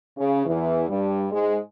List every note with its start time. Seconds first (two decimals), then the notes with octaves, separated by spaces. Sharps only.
0.18 C#3
0.46 E2 E3
0.89 G2 G3
1.32 G#2 G#3